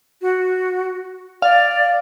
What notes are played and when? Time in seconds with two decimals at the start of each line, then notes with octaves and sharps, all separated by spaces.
0.21 F#4
1.42 D5 F5